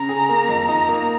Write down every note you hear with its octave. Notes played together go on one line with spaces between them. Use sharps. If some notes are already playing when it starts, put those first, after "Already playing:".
Already playing: C#3 A#5
G#4
A#3
F2
D#4
A#3